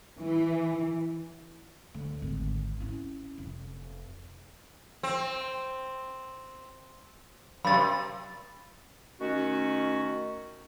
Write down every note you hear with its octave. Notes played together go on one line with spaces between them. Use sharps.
E3
D2
G#1
C#4 E4
F1
C4
F#2 C3 B5 A6
D#3 A3 C#4 F#4